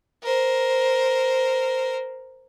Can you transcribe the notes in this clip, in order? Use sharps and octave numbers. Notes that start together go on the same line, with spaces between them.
A#4 C5